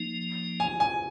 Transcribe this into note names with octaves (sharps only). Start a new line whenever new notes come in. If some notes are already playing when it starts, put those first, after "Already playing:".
Already playing: F3 A#3 D#4
G#5
G#5